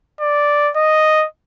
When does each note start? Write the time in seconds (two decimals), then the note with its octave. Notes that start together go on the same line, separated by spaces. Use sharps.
0.21 D5
0.76 D#5